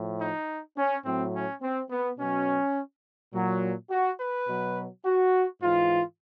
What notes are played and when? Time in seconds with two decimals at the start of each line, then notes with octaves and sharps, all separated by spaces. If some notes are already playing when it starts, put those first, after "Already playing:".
Already playing: A2 F3
0.20 D#4
0.77 C#4
1.05 A2 F#3 C4
1.34 C#4
1.62 C4
1.91 B3
2.19 B2 F#3 C#4
3.34 A#2 F#3
3.90 F#4
4.19 B4
4.48 B2 F#3
5.05 F#4
5.62 G#2 E3 F4